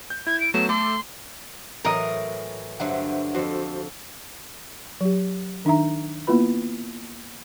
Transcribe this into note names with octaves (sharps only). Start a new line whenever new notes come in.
G6
E4 G#6
D7
F#3 A3 B3 E7
A3 A4 C6 D6
A2 E3 F#3 A#4 D#5
G2 D3 F#3 C5 E5 F#5
F2 F#4 A4 C5
F#3 G4
D#3 D4 D#4 E5 A#5
A#3 B3 E4 F4 B4 B5